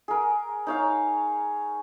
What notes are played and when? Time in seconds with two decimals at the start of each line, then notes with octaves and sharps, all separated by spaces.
0.08 G#4 A#4
0.67 D#4 C#5 F5